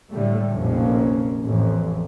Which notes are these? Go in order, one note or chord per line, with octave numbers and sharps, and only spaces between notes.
A2 D3 G3 A3
F1 A#1 F2 A#2 A#3 C#4
A1 F2